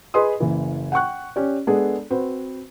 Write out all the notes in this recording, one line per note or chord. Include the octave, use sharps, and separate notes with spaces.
G#4 B4 D#5 C6 D#6
F#1 E3
F#5 G5 C#6 F#6
C#4 G4 D5
G#3 B3 D4 G#4 A4
C4 F#4 B4 C5